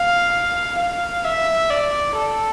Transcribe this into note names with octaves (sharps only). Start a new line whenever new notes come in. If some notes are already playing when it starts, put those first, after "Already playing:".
Already playing: F5
F5
E5
D5
A4